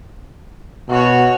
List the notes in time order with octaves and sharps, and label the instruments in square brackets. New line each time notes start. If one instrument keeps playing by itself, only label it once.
[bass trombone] B2 [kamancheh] F#4 C#5